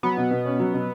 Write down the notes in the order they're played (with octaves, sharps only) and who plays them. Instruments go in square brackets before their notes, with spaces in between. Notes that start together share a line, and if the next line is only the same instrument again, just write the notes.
[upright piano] F#3 [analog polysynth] B3
[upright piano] B2
B2
C#4
F#3
B2